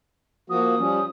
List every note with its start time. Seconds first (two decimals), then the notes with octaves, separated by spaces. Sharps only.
0.50 F3 A#3 F#4 D#6
0.79 F3 G3 C#4